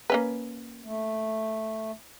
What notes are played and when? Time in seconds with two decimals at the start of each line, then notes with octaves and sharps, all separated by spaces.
0.10 A#3 C#4 B4
0.85 A3